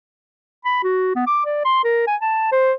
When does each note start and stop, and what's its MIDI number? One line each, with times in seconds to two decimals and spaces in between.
0.65 0.80 83
0.84 1.12 66
1.16 1.25 59
1.27 1.43 86
1.46 1.60 74
1.65 1.79 84
1.84 2.03 70
2.07 2.16 80
2.22 2.50 81
2.52 2.73 72